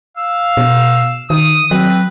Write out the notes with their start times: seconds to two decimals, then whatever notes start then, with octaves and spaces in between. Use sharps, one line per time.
0.17 F5 E6
0.57 B2
1.30 D#3 D#6
1.71 F#3 C4 B4